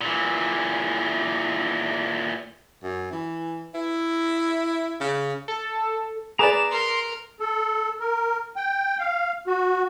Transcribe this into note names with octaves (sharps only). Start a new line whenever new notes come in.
A#2 E3
F#2
E3
E4
C#3
A4
G#4 B4 D5 A#5 D6 E7
A#4 C6
A4
A#4
G5
F5
F#4